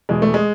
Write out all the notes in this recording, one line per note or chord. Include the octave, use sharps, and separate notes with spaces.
E2 B2 G#3
A3
G#3